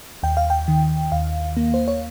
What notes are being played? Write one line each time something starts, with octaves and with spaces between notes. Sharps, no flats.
D#2 G5
F5
G5
D#3
D#2 F5
A#3
C5
C#5